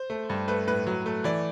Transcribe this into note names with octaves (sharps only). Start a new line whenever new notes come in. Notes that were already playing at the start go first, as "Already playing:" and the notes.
Already playing: C5
A3
G2
A3 B4
A2 B4
F#3
A3
E3 D5